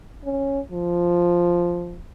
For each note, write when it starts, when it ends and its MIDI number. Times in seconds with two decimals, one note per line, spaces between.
0.24 0.60 61
0.71 2.00 53